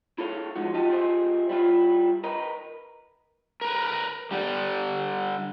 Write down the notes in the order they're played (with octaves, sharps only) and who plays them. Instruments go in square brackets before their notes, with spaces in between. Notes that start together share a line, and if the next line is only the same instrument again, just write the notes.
[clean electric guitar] E4 G#4 A4 C#5 F5
F3 G#3 D#4 F#4
F4 G4 D#5 A5
F4 G4 G#4 C5 D#5 E5
G3 E4 F4
A#4 B4 D#5
[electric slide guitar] A#4 B4
D3 G3